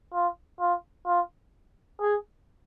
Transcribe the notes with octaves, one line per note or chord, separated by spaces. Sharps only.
F4
F4
F4
G#4